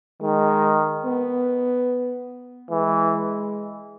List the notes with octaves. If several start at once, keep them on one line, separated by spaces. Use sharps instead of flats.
D#3 G#3
B3
E3 G#3